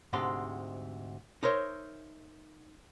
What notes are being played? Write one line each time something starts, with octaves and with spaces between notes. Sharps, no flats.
D2 G#2 C3 G#3 A4 C6
D#4 A#4 C5 C#5 E5